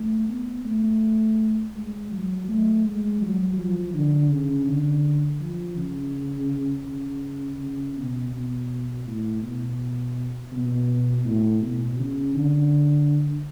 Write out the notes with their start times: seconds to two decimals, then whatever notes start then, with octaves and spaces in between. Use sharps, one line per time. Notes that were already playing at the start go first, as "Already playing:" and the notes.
Already playing: A3
0.29 B3
0.65 A3
1.75 G#3
2.12 F#3
2.48 A3
2.85 G#3
3.22 F#3
3.57 F3
3.94 D3
4.31 C#3
4.67 D3
5.40 F3
5.77 C#3
6.86 C#3
7.59 C#3
7.96 B2
8.33 B2
9.06 A2
9.42 B2
10.52 B2
11.25 A2
11.62 B2
11.99 C#3
12.35 D3